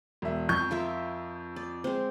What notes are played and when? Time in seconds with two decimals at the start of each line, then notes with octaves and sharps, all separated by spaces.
0.22 E1 E5
0.49 F2 C#6 G6
0.71 F4 A#4 E5
1.56 D5
1.84 G#3 C4